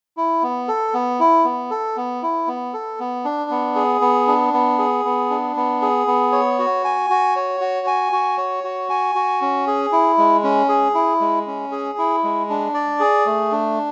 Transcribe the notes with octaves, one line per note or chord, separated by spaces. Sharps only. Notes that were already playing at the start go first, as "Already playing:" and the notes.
E4
B3
A4
B3
E4
B3
A4
B3
E4
B3
A4
B3
D4
B3
G#4
B3
D4
B3
G#4
B3
D4
B3
G#4
B3
C#5
F#4
G#5
F#4
C#5
F#4
G#5
F#4
C#5
F#4
G#5
F#4
C#4
G#4
E4
G#3
C#4
G#4
E4
G#3
C#4
G#4
E4
G#3
D4
D5
G#4
A3
D4